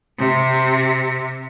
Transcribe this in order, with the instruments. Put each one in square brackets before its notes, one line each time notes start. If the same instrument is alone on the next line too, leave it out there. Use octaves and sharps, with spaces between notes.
[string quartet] C3